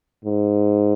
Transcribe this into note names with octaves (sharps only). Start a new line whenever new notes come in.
G#2